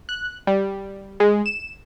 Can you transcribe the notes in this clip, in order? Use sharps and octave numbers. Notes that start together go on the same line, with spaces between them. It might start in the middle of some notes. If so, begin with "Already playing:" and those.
F#6
G3
G#3
E7